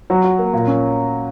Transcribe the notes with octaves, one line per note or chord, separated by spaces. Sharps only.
F#3 F#4
F#4
A#3
A#2
C#4